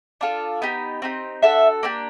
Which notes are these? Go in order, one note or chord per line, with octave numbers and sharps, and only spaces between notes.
D4 F4 A4
B3 D#4 G4
C4 D#4 G4
D4 F#4 A4 E5
A#3 D4 G4